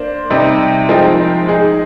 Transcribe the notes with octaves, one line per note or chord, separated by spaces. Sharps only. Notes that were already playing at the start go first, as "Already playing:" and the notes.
Already playing: A#3 D4 C5
C3 G3 C4 D#4
F3 G#3 C4 D#4 A#4
G#3 D#4 G#4